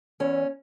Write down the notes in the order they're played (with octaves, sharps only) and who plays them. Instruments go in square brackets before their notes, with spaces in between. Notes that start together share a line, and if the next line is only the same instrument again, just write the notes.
[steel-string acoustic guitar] E2 E3 C#4